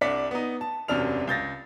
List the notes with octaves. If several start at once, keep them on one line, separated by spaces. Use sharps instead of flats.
C2 D4 D5 B6 C#7
B3 D#4
A5
E1 F#2 C3 D4 F6 F7
C#2 G6 A6 A#6